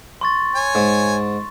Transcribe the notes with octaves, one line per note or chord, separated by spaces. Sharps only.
C6 C#6 A6
C#5 G#5
G#2